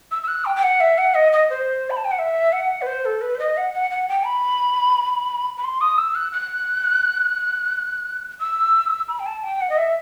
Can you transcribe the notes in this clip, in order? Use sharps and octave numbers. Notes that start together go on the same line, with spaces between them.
E6
E6
F#6
G5
G5
F#5
E5
F#5
D#5
D#5
C5
B5
A5
G5
F#5
E5
F#5
B4
C5
A4
B4
C5
D#5
F#5
F#5
F#5
G5
B5
B5
C6
D#6
E6
F#6
F#6
E6
B5
G5
A5
G5
F#5
D#5
E5